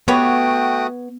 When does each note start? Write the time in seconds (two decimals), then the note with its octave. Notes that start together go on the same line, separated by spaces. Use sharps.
0.08 A3 B3 F#4 G4 B4 C#5 G5 D#6